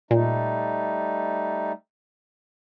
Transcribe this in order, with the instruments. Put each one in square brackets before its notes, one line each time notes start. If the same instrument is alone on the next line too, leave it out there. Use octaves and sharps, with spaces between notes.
[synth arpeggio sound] A#2 [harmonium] G3 A3 D#4